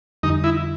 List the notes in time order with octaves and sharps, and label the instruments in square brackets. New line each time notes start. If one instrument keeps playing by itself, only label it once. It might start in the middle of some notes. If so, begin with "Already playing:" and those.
[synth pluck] F2 D3 G3 [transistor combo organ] D#4
[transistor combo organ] E4